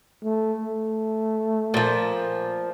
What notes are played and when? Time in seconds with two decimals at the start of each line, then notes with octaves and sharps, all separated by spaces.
0.24 A3
0.61 A3
1.74 A#2 F3